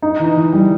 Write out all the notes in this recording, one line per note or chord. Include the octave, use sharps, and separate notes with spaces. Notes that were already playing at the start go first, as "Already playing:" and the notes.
D#4
E3
E3
G3